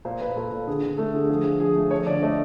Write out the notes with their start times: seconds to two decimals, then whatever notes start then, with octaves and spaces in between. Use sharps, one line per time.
0.05 A#2 C5
0.20 A#2 B4
0.36 A#2 A4
0.52 A#2
0.67 D3 G#4
0.83 D3
0.98 A3 A4
1.13 D3 G#4
1.29 F3 G#4
1.44 F3
1.60 F3 G#4
1.75 A3
1.91 F3 C#5
2.06 D3 D5
2.22 A3 D#5